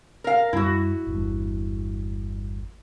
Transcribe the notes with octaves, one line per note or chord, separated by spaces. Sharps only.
A#4 F5
F#2 G3 E4 F#4
G1 E2 G2